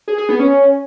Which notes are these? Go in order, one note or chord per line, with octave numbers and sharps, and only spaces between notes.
G#4
G#4
B3
C#4